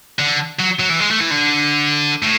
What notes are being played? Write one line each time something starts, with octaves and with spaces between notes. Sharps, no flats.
D3
F#3
F#3
E3
G#3
A3
E3
D3
A2